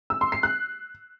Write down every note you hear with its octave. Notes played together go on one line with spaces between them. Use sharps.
E6
C6
C7
F#6